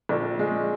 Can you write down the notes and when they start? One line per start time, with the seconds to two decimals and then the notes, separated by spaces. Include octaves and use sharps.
0.09 A#1
0.39 G#3